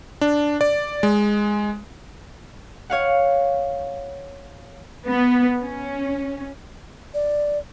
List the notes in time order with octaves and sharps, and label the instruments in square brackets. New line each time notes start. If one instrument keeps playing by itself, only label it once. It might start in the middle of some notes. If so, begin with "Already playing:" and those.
[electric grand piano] D4
D5
G#3
[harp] C#5 F5 F#5
[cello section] B3
C#4
[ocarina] D5